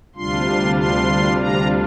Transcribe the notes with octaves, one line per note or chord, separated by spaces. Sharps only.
D2 C3 G3 D4 F4 C6
C6
A#5